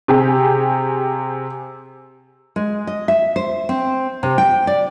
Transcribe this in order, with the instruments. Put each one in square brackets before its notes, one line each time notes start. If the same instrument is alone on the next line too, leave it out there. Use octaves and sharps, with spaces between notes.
[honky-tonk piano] C3 G4 G#4
[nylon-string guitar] G#3
D#5
E5
C5
C4
C3
G5
D5